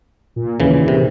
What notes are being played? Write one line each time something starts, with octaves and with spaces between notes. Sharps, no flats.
A#2
D#2 A#2 C#3 E3
C3